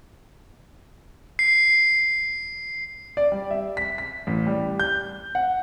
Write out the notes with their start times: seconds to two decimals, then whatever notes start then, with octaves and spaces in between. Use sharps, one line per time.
1.39 C7
3.17 D5
3.32 G3
3.51 E5
3.77 B6
3.98 B6
4.27 A1
4.47 G3
4.80 G6
5.35 F#5